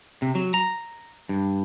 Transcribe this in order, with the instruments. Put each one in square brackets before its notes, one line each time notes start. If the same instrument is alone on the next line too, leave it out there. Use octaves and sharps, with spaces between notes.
[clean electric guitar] C3
F#3
A#5
G2